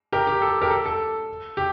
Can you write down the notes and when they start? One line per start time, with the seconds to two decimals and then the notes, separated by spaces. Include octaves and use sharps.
0.13 G4 A#4
0.27 G4
0.42 A4
0.62 G4 A#4
0.70 A4
0.86 A4
1.57 G4